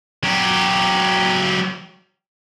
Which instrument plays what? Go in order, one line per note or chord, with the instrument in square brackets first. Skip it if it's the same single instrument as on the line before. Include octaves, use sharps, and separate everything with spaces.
[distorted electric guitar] F#3 G4